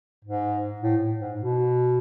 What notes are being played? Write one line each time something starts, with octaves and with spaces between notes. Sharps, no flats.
G#2
A2
G#2
B2